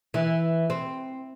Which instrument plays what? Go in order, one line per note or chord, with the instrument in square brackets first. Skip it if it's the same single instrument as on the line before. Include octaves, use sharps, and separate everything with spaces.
[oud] E3
C4